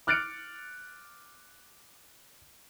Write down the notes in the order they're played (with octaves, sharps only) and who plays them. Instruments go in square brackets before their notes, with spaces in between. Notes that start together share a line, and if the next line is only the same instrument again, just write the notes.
[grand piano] D6 F6 F#6 A6 C#7 D7